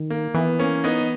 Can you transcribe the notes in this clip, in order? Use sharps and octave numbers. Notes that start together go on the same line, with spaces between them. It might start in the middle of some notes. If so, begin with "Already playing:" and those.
Already playing: D#3
A#3
E3 B3
A#3 C#4
B3 D#4